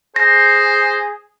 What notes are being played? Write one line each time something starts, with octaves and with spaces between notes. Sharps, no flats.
G#4 C5 A#6